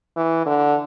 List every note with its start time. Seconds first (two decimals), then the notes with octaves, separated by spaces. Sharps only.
0.17 E3
0.46 D3